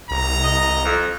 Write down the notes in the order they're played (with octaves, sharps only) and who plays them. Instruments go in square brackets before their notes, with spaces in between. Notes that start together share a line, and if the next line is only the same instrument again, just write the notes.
[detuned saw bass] C2 [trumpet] A#5
[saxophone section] D#5
F2